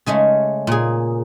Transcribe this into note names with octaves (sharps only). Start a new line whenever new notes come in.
C#3 G#3 A3 C#4
A#2 G#4